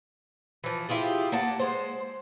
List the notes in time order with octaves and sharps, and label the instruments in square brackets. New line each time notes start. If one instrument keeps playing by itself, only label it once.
[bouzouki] E3 F3
E4 F4 G4 G#4
A#3 F#5 A5
G#3 C5